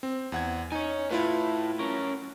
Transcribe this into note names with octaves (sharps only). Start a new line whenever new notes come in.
C4
E2 F#5 G#6
D#4 C#5 G#5
A2 E4 F4 B4
C#4 A#4